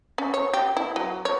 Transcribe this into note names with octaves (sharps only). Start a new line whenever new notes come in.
C#4
C#5
G4
E4
F#3
C#5